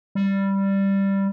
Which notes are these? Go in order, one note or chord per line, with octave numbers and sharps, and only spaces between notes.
G3